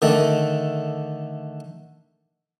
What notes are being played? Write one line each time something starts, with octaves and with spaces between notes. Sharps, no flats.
D3 D#3 A3 D4